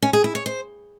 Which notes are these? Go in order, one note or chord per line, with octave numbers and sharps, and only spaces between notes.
C#4
G#4
E4
C#5
C5